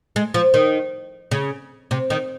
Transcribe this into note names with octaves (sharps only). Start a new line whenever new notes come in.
G#3
F3
D#3
C#3
C3
D#3